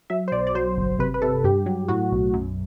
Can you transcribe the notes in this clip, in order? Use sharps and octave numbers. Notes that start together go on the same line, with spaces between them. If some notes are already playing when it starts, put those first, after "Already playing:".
F#3 E5
C5
B1 D5
D5
F#3 C5
G1
C3 B4
B4
C3 A4
G2 G4
F#3
A2 F#4
B1
F#2